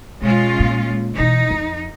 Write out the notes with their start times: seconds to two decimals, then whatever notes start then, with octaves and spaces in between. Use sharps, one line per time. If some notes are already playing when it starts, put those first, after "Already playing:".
0.21 B2 G#3 C#4 F4
0.60 A#2
1.17 B2 E3 D#4
1.51 F2